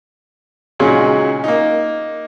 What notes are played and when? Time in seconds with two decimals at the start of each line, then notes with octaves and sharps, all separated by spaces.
0.79 A#2 C#3 F#3 G#3 C#4 D#4
1.44 A#3 D#4